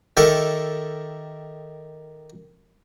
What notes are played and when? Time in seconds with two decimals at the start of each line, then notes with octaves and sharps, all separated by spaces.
0.17 D#3 G4 A4 A#4 E5 C#6